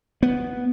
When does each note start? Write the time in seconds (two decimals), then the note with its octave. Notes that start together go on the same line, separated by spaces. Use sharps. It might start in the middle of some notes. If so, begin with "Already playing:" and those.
0.23 B3